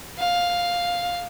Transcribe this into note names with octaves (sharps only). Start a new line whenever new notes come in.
F5